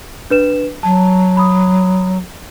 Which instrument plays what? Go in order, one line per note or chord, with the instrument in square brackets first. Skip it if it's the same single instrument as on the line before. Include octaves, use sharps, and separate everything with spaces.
[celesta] D4 B4 E7
[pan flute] F#3 [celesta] A5
[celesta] B5 D#6